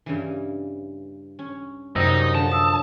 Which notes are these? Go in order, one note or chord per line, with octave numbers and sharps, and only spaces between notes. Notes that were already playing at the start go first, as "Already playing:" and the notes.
G2 C#3 E3
C#4
F#2 C3 F#3 G3 D#4 D#5
D3 F3 A5
D#6 E6